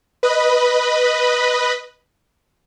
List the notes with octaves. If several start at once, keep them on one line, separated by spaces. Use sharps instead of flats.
B4 D#5 B5